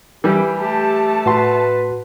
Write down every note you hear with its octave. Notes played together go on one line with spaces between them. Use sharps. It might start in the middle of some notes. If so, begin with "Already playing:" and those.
E3 G3 G4
A3 G4 A5
A2 F#4 B4 C6